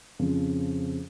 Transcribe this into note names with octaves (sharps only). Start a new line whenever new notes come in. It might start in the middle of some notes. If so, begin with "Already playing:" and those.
F2 C#3 F3